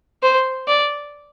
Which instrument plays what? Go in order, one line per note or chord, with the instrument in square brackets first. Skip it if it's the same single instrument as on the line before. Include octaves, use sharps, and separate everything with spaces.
[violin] C5
D5